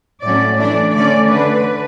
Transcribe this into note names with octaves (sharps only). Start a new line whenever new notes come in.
A2 F#3 A3 C#4 D5
E3 A3 D4 D5
D3 A3 C#4 D5
D3 A3 D4 B4